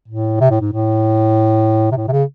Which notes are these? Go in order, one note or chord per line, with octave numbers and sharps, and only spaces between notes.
A2
C3
A2
G#2
A2
C3
A2
C3
C#3